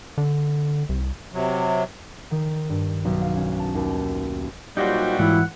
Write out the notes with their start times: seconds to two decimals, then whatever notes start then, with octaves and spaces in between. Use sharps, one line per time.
0.18 D3
0.89 C2
1.33 C3 F#3
2.31 D#3
2.70 G2
3.05 B1
3.22 F5
3.36 C#4
3.60 A5
3.75 D#2
4.77 A#2 F#3 G3 D#4 F#4 C5
5.19 G#2 E3 E4 F#5